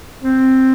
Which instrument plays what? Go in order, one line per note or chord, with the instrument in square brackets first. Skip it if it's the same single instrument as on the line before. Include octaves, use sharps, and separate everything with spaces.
[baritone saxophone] C4